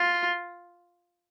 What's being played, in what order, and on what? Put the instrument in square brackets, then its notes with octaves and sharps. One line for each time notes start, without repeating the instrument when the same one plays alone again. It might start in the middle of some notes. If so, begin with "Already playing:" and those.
Already playing: [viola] F4